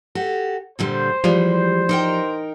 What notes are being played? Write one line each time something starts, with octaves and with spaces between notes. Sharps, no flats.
F#4 G4 A4
A#2 D3 G3 C5
E3 F3 G3 G#3 G4 D5
D#4 A#4 G5